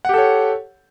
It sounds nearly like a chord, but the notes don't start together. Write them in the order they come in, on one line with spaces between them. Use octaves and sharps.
F#5 G4 A4 C#5